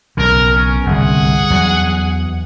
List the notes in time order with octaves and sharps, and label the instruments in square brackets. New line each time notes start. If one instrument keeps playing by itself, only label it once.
[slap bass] B1 C#3 [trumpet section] A#4
[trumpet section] C#4
[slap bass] G1 C2 [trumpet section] G#4 F#5
[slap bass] E2 F#3